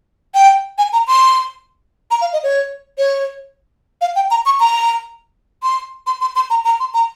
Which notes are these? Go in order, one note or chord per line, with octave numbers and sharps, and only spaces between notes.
G5
G#5
A#5
C6
A#5
F5
D#5
C#5
C#5
F5
G5
A#5
C#6
A#5
C6
C6
C6
C6
A#5
A#5
C6
A#5